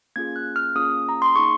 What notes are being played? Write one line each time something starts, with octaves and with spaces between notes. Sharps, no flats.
A#3 C#4 F4 G#4 G#6
F#6
F6
A#3 C#4 F4 G#4 D#6
A#5
C6
A#3 D#4 G#4 C#6